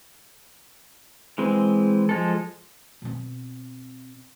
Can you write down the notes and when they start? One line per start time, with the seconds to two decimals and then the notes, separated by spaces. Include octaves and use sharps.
1.38 E3 G#3 C4
2.09 F3 G#3 A4
3.02 B2 C4